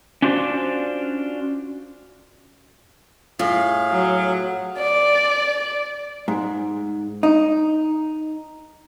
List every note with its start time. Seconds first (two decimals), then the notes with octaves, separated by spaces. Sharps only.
0.22 C#4 D4 F4 F#4 C5 D5
3.39 A2 F4 G#4 F5
3.91 F#3
4.78 D5
6.28 G#2
7.23 D#4